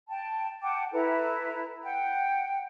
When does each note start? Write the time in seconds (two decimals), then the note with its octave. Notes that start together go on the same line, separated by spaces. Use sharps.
0.09 G5 A5
0.62 F#5 G5 A5 D6
0.92 E4 A4 B4 A#5
1.83 F#5 G5